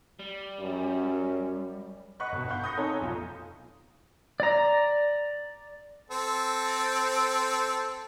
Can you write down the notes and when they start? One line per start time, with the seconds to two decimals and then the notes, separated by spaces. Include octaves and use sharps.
0.19 G3
0.60 F#2
2.20 D#5 F#5 B5 C#6 F#6 B6
2.32 G1 B2
2.48 F5 F#5 B5 C#6 G6
2.62 B5 D#6 G6 A#6 C#7
2.77 C4 D#4 A4 C#5 G#5 A#5
3.00 F1 B1 F4
4.40 D5 A#5
6.11 C4 A4